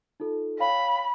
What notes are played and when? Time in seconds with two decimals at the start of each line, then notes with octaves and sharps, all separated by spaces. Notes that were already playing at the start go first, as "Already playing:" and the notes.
0.20 D#4 F4 A4
0.59 C#5 F5 G5 B5